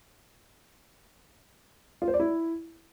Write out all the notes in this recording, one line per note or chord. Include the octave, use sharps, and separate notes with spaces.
F4
C5
D5
E4